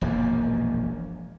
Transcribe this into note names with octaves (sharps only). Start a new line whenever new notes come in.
E1 A#1 F#2 A#3